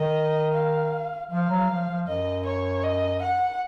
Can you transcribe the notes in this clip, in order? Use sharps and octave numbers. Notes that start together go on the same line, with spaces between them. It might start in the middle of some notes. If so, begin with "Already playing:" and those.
Already playing: D#3 D#5
F5
F3 F5
F#3
F3
F3
F#2 D#5
C#5
D#5
F#5